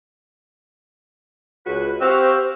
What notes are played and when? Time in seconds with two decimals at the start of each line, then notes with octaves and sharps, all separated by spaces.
1.66 C#2 F#4 B4
2.01 C4 F#4 G4 C5 F5 E6